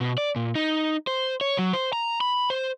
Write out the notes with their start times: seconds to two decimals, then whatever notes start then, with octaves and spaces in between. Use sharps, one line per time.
0.01 B2
0.18 D5
0.36 A#2
0.55 D#4
1.07 C5
1.41 C#5
1.58 F#3
1.73 C5
1.93 A#5
2.21 B5
2.50 C5